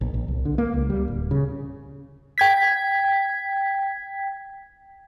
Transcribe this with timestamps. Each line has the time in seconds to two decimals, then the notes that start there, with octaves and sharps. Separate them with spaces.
0.01 A#1
0.14 A#1
0.28 C2
0.45 D3
0.58 A#3
0.74 C#2
0.90 G3
1.08 D1
1.31 C#3
2.38 G5 G#6 B6